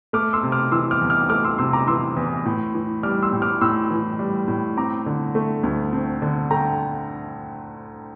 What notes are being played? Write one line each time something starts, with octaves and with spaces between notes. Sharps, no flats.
A3 D6 F6
C6 E6
C3
D6 F6
E3 C6 E6
D6 F6
E2
D6 F6
A3 D6 F6
C6 E6
C3 C6 E6
A#5 D6
E3 C6 E6
E2
A2
E3
G3 D6 F6
C6 E6
A2
D6 F6
A2 C6 E6
E3
G3
A2
C4 A#5 D6
D3
A3
D2
C4
D3
A3 G5 A#5